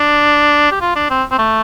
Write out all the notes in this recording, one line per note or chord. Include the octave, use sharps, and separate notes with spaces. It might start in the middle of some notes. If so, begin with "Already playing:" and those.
Already playing: D4
G4
F4
D4
C4
C4
A3